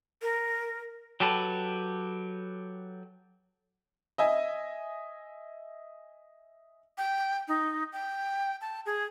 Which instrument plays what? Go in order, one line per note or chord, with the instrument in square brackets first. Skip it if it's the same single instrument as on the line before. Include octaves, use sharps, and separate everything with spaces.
[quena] A#4
[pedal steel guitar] F#3 G4 A4 B4
[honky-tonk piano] D#5 E5 G#5
[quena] G5
D#4
G5
A5
G#4